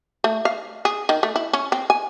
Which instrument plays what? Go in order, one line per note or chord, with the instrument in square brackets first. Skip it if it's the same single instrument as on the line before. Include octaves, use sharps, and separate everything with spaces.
[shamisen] A3
F5
G#4
D#3
A3
E4
C#4
C4
G#5